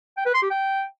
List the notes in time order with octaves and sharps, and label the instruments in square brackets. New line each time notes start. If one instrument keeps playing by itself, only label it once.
[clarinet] G5
B4
C6
G4
G5